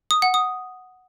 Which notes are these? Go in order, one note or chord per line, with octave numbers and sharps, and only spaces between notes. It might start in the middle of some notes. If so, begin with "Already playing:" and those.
D#6
F#5
D#6